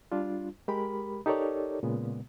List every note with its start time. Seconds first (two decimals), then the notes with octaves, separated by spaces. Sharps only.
0.12 G3 D4 F4
0.68 G#3 G4 A#4 B5
1.26 D#4 G4 A4 A#4 C#5 D5
1.83 A#2 C#3 G#3 B3